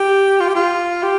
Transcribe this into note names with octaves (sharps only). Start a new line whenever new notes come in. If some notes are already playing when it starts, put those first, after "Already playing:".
Already playing: G4
F4
G4
F4
G4